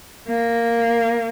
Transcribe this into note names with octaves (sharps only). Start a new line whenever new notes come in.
A#3